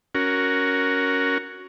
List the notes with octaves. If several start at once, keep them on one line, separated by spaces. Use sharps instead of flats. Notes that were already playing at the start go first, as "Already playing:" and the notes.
C#4 F#4 A#4